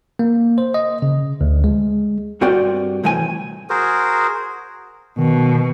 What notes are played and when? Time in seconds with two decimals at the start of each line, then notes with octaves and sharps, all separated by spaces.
0.19 A#3
0.58 C5
0.74 D#5
1.02 C#3
1.41 D2
1.64 G#3
2.41 G2 C4 F#4 A#4 D5 G5
3.03 C2 A2 E3 G5 G#5
3.70 F#4 G#4 A#4 C5
5.18 B2 D#3